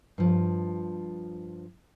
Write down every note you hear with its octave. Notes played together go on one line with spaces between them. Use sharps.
G2 F3